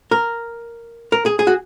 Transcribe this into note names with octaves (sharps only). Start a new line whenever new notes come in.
A#4
A#4
G#4
G#4
F#4